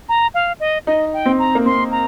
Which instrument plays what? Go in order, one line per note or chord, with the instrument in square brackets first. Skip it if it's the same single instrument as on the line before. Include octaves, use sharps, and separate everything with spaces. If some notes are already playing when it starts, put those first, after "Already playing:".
[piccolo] A#5
F5
D#5
[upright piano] D#4 [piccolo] D#5
[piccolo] G5
[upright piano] C4
[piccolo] A#5
[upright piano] A#3
[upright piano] C4 [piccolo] C6
[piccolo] A#5